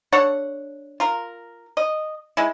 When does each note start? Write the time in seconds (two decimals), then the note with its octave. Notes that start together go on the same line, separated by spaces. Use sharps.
0.12 D4 A4 C#5 F#5
1.00 F4 A#4
1.77 D#5
2.37 G#3 E4